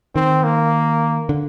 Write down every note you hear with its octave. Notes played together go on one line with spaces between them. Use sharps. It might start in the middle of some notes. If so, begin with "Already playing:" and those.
D#3 C4
A#3
D3